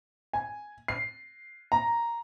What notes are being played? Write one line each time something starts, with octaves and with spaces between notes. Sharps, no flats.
G#5
C7
A#5